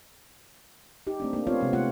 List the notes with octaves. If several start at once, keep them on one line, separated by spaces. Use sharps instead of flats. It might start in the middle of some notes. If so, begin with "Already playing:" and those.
D#4 G4
A3 C4 D4
A#3 D4
B3 C4 F4 C#5 F5
C3 G#3 C4
A3 B3 F4 F#5